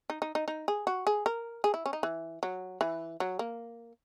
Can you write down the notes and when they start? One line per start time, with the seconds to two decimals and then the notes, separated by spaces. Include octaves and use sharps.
0.10 D#4
0.22 D#4
0.35 D#4
0.48 D#4
0.68 G#4
0.87 F#4
1.07 G#4
1.26 A#4
1.64 G#4
1.74 E4
1.86 C#4
1.93 D#4
2.03 E3
2.43 F#3
2.81 E3
3.20 F#3
3.39 A#3